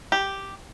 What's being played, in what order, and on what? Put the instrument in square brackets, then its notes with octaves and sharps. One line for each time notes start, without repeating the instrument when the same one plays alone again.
[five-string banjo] G4